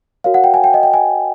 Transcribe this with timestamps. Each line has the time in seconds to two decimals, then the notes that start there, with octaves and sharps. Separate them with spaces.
0.24 F#4 A#4 C#5 F5
0.34 F#5
0.44 G5
0.54 G#5
0.64 G5
0.74 D#5
0.83 G5
0.94 G#5